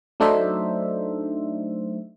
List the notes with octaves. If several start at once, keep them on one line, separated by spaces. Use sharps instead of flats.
F#3 A3 D4 D#4 C5 E5